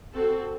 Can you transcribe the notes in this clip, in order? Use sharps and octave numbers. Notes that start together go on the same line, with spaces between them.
C4 F#4 A4